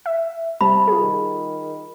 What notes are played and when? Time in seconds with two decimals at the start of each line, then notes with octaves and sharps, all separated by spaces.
0.06 E5
0.61 C3 G3 A5 B5
0.88 F4 G#4
1.01 D#3